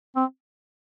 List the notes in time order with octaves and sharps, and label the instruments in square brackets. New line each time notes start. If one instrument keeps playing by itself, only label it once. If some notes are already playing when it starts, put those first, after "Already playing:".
[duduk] C4